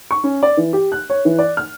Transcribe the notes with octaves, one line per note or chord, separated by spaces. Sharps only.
C#6
C#4
D5
E3
G4
F#6
C#5
E3
D5
F6